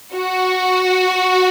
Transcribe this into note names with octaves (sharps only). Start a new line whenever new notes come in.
F#4